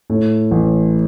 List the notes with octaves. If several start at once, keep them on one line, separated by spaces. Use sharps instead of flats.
A2
A1